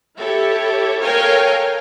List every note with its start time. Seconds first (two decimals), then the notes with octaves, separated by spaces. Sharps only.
0.18 E4 G4 A4 C#5
1.01 A4 A#4 C#5 F5 G5 G#5